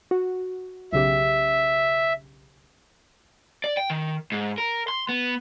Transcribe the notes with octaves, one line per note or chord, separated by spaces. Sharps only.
F#4
B1 C#3 G4 E5
D5
G5
D#3
G#2
A#4
C6
B3